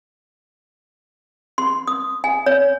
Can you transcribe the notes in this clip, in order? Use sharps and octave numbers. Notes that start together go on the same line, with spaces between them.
C6
D#6
G#5
C#5